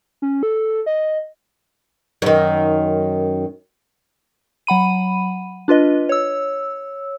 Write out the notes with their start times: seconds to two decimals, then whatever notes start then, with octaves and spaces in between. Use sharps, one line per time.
0.22 C#4
0.43 A4
0.86 D#5
2.22 F#2 D#3
4.67 F#3 F#5 B5 D#7
5.68 D4 F4 B4 D#5
6.09 C#5 E6